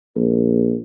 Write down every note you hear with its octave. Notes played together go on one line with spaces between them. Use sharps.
A#1